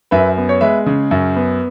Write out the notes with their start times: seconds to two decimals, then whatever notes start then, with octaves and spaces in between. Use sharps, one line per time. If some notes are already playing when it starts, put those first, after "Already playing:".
0.11 F#2 B4 E5
0.37 B3
0.49 C#5
0.61 G#3 B4 E5
0.86 C#3
1.11 F#2
1.36 B3